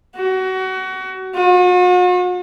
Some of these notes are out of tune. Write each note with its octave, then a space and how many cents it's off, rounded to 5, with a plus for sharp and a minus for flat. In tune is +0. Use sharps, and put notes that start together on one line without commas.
F#4 +25
F#4 -45